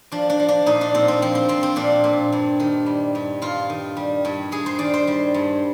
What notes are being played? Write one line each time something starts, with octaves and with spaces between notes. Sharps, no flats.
F3 D4
D4
F3
D4
A#2 D#4
D4
A#2 C4
C4
F3 C4
C4
F3 C4
C4
A#2 D4
A#2
G2
D#3
G3
G2
G2 F4
D#3
G3
G2
G2 G#4
C5
D#3 D5
C5
G3
G2